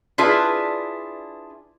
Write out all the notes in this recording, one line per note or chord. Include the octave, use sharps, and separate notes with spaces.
D4 E4 F4 G#4 B4 E5